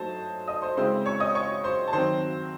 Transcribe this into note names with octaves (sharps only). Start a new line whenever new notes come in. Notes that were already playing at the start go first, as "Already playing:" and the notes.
Already playing: F#3 A3 D#4 C5 A5
D#5 D#6
C5 C6
C#3 G#3 C4 E4 C5 C6
C#5 C#6
D#5 D#6
C#5 C#6
C5 C6
A5
D#3 F#3 C4 C5 C6